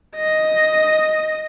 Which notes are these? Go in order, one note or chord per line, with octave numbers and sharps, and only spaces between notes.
D#5